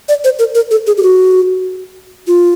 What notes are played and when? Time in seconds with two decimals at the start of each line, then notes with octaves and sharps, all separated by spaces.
0.09 D5
0.24 C5
0.39 A#4
0.55 A#4
0.71 A4
0.87 G#4
0.97 G4
1.03 F#4
2.27 F4